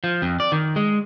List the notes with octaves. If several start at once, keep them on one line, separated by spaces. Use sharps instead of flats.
F3
F2
D5
D#3
G#3